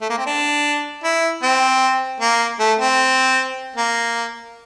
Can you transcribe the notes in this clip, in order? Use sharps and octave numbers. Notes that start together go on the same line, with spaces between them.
A3
A#3
C4
D4
E4
C4
A#3
A3
C4
A#3